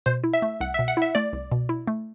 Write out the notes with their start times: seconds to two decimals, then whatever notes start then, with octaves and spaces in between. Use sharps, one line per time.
0.06 B2 C5
0.24 E4
0.34 E5
0.42 A3
0.60 C2 F#5
0.74 E5
0.79 B2
0.88 F#5
0.97 E4 E5
1.15 A3 D5
1.33 C2
1.52 B2
1.69 E4
1.87 A3